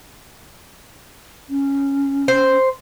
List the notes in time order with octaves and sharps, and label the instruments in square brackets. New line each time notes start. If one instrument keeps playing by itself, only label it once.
[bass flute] C#4
[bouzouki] C5